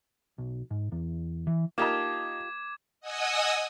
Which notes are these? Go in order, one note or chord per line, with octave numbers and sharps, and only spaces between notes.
B1
G#2
E2
E3
A#3 D#4 F4 G4 A5 D6 G#6
D#5 F#5 G#5 D#6 E6